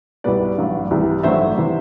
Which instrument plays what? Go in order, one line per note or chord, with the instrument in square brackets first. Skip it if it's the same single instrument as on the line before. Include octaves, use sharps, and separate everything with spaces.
[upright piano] C2 B2 G3 B4 D5
A1 G2 F#3
C2 C3 E3 G3
A1 G2 F#3 A3 C5 E5
C3 E3